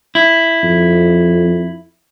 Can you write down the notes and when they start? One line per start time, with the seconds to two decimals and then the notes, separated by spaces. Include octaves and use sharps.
0.15 E4
0.63 F2